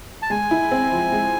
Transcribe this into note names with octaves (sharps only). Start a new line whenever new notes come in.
A5
G#3 G#5
E4
C4
F3
G#3